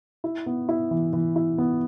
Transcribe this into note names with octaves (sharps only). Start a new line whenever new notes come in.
E4
B3
E4
E3
E3
E4
B3